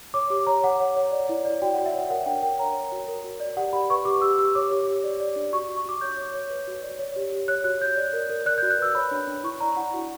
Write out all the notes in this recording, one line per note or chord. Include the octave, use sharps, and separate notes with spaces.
C#5 D6
G4 D6
C#5 A#5
C#5 F#5
C#5
C#5
D5
E4
D5
F#4 G5
F#4 F#5
E5
C#5 F#5
A#4 F#5
D4 G5
A#4 G5
C#5 A#5
C#5
F#4
A#4
F#4
D5
G4 F#5
G4 B5
B4 C#6
G4 D6
G4 E6
G4 E6
C#5 D6
G4
G4
D5
D5
D4
F#4 C#6
F#4
C#6
F#4 D6
C#5 G6
C#5
C#5
B4
F#4
D5
C#5
G4
G4
C#5 F#6
F#4 F#6
C#5 G6
D5
A#4
A#4
D5 F#6
F#4 G6
F#6
B4 E6
C#5 B5
D4
D4
E4 C#6
D5 A#5
E4 F#5
F#4